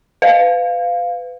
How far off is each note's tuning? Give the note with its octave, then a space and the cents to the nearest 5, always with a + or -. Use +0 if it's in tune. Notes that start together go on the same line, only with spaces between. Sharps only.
B4 +30 F5 +0